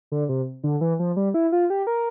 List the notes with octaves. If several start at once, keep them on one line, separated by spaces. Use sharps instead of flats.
D3
C3
D3
E3
F3
G3
E4
F4
G4
A#4